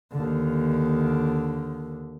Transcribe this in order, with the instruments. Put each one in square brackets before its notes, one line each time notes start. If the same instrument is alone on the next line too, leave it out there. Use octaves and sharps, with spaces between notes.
[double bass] D#2 D3